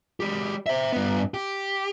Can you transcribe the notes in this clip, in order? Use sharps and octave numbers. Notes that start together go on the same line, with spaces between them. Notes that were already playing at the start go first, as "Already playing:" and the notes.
G#3 G4
C5 E5
G2 B3
G4